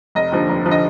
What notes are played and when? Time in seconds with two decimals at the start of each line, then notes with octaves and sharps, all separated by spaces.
0.15 F1 D#5
0.32 D#2 D3 F3
0.49 F1
0.66 D3 F3
0.71 D#5